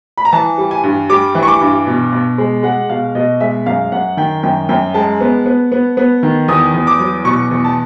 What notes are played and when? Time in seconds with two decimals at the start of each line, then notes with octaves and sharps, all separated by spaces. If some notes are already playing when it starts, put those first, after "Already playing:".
0.18 B5
0.25 A#5
0.32 E3 A5
0.58 G3
0.71 G#5
0.83 G2
1.09 G3 D6
1.35 E3
1.43 C#6
1.48 D6
1.61 G2
1.87 B2
2.12 B2
2.38 G#3
2.63 G#3 F#5
2.90 B2 F5
3.15 B2 D#5
3.40 G#3 E5
3.66 F#2 F5
3.92 F#2 F#5
4.17 D#3 G5
4.43 F#2 G5
4.69 F#2 G5
4.94 G#3 A5
5.21 B3
5.46 B3
5.72 B3
5.97 B3
6.23 D#3
6.48 E2 D#6
6.74 E2
6.87 D6
7.00 F#3
7.25 B2 C#6
7.51 E2
7.64 A5